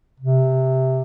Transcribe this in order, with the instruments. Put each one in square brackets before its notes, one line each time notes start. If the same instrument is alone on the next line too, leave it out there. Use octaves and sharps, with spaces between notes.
[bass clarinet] C3